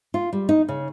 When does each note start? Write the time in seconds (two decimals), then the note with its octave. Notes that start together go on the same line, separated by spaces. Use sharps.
0.14 F4
0.33 G3
0.49 D#4
0.69 C#3